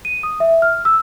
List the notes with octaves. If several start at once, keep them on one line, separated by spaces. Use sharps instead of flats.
D#7
D#6
E5
F6
E6